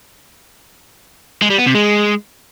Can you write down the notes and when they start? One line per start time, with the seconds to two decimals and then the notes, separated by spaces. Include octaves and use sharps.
1.42 G#3
1.50 G3
1.58 B3
1.66 C3
1.75 G#3